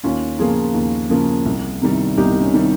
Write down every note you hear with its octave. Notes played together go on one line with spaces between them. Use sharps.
D#2 C#4 F4
C#3 F3 A#3 F4 G#4
D#2
C#3 F3 A#3
C2
C3 D#3 G3
C2 D#4 G4
C#4
C3 D#3 G3